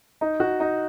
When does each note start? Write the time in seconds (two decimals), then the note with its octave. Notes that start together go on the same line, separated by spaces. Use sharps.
0.21 D#4
0.40 F#4
0.60 D#4